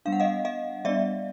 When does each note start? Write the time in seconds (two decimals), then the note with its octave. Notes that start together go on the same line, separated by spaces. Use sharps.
0.05 G3 B3 D4 F5
0.12 F#5
0.20 D#5 F5
0.45 D#5 F5
0.85 G3 B3 D4 D5 E5